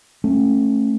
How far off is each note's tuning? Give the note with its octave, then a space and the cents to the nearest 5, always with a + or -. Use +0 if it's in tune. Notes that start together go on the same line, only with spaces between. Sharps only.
A3 +0 C#4 -30